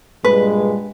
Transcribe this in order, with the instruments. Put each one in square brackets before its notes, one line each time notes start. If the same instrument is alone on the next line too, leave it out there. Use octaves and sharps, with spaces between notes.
[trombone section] G2 A#2 G#3 [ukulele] B4